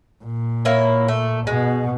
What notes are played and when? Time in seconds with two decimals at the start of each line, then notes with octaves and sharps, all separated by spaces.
0.24 A#2
0.65 A#3 E4 C#5
1.08 A3
1.47 B2 G#3